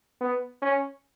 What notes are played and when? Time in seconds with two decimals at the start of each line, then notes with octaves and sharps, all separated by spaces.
0.21 B3
0.62 C#4